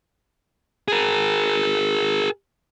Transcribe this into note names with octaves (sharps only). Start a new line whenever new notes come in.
G#4 A#4